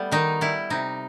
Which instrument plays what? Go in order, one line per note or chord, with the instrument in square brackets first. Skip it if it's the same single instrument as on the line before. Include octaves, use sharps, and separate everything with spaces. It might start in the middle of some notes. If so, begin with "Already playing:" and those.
Already playing: [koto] G3 A3 B3
D#3 D#4
G3 E4
C3 D#4